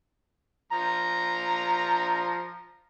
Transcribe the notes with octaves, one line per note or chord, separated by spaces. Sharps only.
F3 A#5